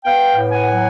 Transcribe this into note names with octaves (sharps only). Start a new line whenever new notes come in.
B3 F5 G5
A2
F#5 G#5
F#3